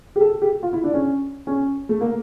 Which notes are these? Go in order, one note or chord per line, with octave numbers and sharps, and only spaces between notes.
G4
A4
G4
F4
E4
D4
C#4
C#4
A3
A#3